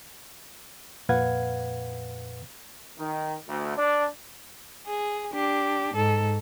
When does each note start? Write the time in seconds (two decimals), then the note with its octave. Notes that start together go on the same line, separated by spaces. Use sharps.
1.09 F2 A#2 B4 F5 F#5 G#6
2.97 D#3
3.47 D2
3.77 D4
4.87 G#4
5.33 D4 G4
5.95 G#2 A4